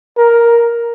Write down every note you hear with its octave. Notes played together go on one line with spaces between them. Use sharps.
A#4